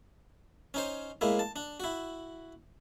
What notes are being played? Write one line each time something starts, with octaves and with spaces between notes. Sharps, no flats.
C#4 D#4 C5
A2 G#3 A#3 E4
A5
D4
E4 F#4